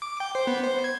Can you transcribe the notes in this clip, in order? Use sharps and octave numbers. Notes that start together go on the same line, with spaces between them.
D6
G5
C5
B3
C5
G#6